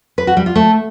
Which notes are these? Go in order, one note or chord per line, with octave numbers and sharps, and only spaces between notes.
B4
F#4
G3
F4
A3